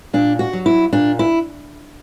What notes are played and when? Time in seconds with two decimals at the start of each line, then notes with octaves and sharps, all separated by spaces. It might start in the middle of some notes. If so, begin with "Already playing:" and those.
0.13 A#2 D4
0.39 F#4
0.53 F#3
0.66 E4
0.93 A#2 D4
1.19 E4